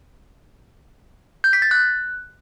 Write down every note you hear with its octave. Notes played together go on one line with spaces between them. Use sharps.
G6
B6
A6
F#6